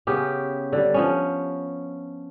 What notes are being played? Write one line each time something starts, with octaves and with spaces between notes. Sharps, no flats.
C#3 B3 C#4 G4
D3 G3
F3 B3 C#4